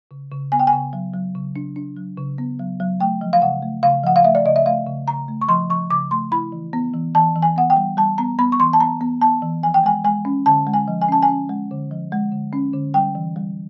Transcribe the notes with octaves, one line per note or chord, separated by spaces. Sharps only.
C#3
C#3
B3 G#5
G5
G#5
C#3
F#3
F#3
C#3
D4
D4
F#3
C#3
B3
F#3
F#3
A3 G5
F3
F5
C#3 F#5
A3
C#3 F5
F3 F#5
F5
A3 E5
D5
C#3 D#5
E5
A3 F5
C#3
C#3 A#5
A3
C#6
F3 C6
F3 C#6
C#3 D6
A3 C6
E4 B5
E3
B3
E3
E3 A5
E3
G#5
B3 F#5
G5
G3
G3 A5
B3 A#5
B3 B5
C#6
E3 C6
A5
B3 A#5
B3
B3 A5
E3
F3 G#5
G5
G#3 G#5
G#3 G#5
C#4
D3 A5
G#3
G#5
F3
G#5
C#4 A5
G#5
C#4
G#3
D3
F3
G#3
D3
C#4
D3
G3 G5
E3
G3